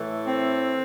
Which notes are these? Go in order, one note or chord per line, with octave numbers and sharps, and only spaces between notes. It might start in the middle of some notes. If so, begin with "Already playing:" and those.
Already playing: A2 E3 A3
C4